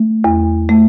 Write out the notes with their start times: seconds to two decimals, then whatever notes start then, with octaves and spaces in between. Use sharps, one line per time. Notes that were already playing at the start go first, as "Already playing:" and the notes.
Already playing: A3
0.24 E2
0.69 A3